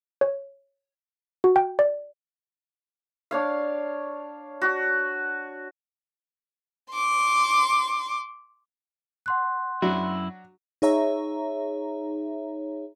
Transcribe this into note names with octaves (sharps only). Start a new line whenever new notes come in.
C#5
F#4
G5
D5
D4 C#5 F5
F#4
C6 D6
F#5 C6 F#6
F#2 F#3 D4 E4 F#4
D#4 G#4 C#5 E5 A#5